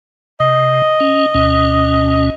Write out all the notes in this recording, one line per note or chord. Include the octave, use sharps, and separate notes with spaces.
C3 D#5
C#4
D2 B2 C#4